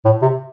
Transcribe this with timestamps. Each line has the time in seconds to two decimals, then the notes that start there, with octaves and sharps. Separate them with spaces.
0.05 A2
0.22 C3